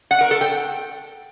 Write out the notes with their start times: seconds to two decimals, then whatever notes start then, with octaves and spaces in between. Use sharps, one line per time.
0.11 F#5
0.21 A#4
0.31 A4
0.41 G5